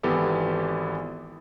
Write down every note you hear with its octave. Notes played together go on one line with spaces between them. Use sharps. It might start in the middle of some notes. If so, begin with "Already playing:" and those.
G#1 E3 B3 E4 G4 A4